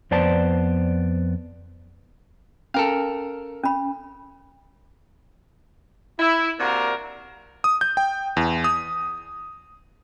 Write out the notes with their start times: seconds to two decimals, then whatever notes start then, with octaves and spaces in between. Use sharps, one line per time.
0.11 F2 B3 C5 D5 A5
2.74 C#4 A4 A#4 F5
3.64 C#4 B5
6.19 E4
6.60 C3 A#3 D4 F#4 A#4
7.64 D#6
7.81 G6
7.97 G5
8.37 E2
8.64 D#6